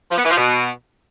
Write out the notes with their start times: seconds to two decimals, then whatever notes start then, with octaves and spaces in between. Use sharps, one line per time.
0.11 F3
0.18 B3
0.24 E3
0.31 F3
0.37 B2